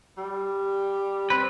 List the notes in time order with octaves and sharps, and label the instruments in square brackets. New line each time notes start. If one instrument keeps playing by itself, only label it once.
[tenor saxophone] G3
[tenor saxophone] C4 [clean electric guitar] B4